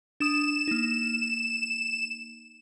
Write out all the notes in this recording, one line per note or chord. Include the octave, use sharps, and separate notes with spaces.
D4 D#6 E7
A#3 D#4